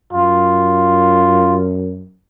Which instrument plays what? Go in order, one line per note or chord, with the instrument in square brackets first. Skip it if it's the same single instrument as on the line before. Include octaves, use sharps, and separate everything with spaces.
[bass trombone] F#2 [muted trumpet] F4